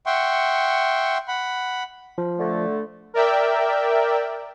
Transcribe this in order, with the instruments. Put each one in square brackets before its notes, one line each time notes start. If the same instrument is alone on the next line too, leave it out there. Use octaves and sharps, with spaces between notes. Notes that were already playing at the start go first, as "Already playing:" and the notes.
[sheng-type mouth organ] E5 F#5 G5 C6 C#6
F#5 B5
[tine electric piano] F3
[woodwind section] D3 A3
[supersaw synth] A#4 D5 E5 G5